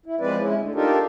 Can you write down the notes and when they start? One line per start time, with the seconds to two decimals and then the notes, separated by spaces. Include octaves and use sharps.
0.06 E4
0.20 F3 G#3 C4 B4 D5
0.39 G#3 C#4 E4
0.58 A2 D3
0.75 D4 D#4 F4 G4 A4 A#4